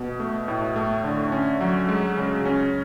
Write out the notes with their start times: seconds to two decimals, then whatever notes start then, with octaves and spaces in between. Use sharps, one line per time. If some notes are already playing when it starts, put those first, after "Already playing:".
Already playing: B2
0.20 A3
0.48 A2
0.76 A3
1.04 D3
1.32 C#4
1.61 F#3
1.89 G#3
2.17 C#3
2.45 C#4